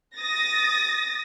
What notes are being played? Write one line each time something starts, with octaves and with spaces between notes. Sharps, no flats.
D#6 A6 A#6